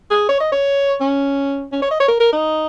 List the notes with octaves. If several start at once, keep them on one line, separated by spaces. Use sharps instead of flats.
G#4
C#5
D#5
C#5
C#4
C#4
C#5
D#5
C#5
A#4
A#4
D#4